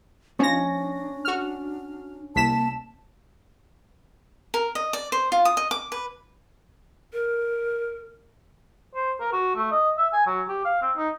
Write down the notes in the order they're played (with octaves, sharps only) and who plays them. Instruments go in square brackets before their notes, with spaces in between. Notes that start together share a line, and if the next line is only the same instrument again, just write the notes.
[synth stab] F3 A#6 [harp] C#4 [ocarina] D4
[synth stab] F#4 F6
[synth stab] C2 B6 E7 [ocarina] A#3 [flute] A5
[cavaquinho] A#4
D#5
D5
C5
F4
D#6
D#5
D6
B4
[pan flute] A#4
[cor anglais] C5
A#4
F#4
A3
D#5
E5
G#5
F#3
G4
F5
C4
D#4